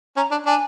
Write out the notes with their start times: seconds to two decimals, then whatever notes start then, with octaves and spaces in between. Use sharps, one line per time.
0.17 C#4 A#5
0.31 D4
0.46 D4 G#5